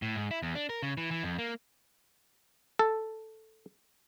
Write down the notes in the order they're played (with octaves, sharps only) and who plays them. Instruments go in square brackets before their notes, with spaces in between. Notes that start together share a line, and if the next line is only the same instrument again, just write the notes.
[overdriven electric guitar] A2
G#2
E4
E2
D4
A#4
C#3
E3
E3
F2
A#3
[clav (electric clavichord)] A4